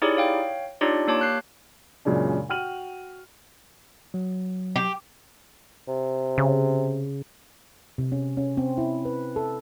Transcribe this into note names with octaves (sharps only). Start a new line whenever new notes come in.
D#4 E4 G4 G#4 C#5 D5
C#5 F5 G5
D4 D#4 F4 G4 C#5 D5
A#3 G4 C#5 A5 D6
F#6 G6 C7
F#2 A#2 C#3 G#3 D4
F#4 G5 F6 D#7 F#7
F#3
G4
C3
C#3
C3
C#4
C#4
C4
E4
B4
A4